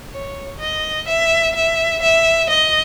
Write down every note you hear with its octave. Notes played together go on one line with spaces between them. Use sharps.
C#5
D#5
E5
E5
E5
D#5